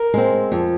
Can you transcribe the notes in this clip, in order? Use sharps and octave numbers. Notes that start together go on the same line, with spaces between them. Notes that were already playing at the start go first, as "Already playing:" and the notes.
Already playing: A#4
G#3 C4
F2